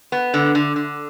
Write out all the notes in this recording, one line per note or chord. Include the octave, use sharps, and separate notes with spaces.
B3
D3
D3
D3